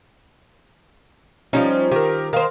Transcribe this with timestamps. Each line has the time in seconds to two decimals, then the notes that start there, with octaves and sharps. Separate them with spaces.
1.53 F3 G3 C#4 D#4
1.91 D#3 G4 A#4
2.33 D#3 A#4 C5 F5